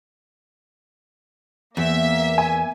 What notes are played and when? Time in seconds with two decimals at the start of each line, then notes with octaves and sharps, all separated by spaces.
1.77 E2 A#3 E5
2.38 G#5